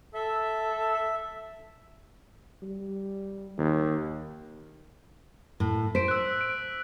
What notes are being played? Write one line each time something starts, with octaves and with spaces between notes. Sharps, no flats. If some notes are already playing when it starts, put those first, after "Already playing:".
A4 E5
G3
D#2
A2
C5 B6 D7
E6 F#6
D7